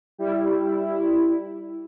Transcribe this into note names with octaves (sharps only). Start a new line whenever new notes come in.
G3 E4